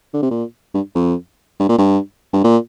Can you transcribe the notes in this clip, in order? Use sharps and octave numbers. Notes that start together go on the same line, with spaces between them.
D3
C3
A#2
G2
F2
G2
A#2
G2
G2
A#2